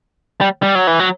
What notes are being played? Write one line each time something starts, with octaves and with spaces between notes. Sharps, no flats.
G3
G3
F#3
E3
F#3